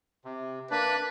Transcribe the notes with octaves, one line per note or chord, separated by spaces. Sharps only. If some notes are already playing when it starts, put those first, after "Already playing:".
C3
A#3 D4 B4 D5